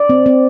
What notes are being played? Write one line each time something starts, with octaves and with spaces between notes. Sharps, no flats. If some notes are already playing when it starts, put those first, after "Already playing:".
Already playing: D5
C4
C4